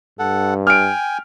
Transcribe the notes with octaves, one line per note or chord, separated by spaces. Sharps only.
G2 A4 F#5
G5 G#5 F6 D7